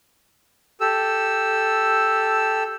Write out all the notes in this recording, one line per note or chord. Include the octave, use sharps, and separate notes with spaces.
G4 A4 E6